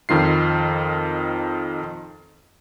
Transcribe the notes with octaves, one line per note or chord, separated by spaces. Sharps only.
F2 D#3 F4 C7